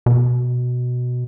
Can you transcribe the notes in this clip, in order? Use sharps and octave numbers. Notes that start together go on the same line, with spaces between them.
B2